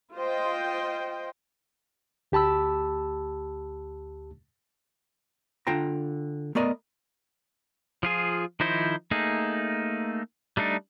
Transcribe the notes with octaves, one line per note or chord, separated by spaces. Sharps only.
F4 C5 D#5 G5
D2 G4 A5 B5 E6
D3 F4 G5 A#5
A3 B3 A#4 D5 D#5
F3 F4 G#4
D#3 F3 D#4 E4 C5
A3 A#3 D#4 G#4
G3 A3 D4 D#4